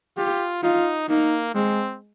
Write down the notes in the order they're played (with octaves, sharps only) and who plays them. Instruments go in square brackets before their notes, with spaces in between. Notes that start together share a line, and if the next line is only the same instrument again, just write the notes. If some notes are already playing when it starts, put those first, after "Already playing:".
[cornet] F4 [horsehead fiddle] G4
[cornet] D#4 [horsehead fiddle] F4
[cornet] A#3 [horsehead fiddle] D#4
[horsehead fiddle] G#3 [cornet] C4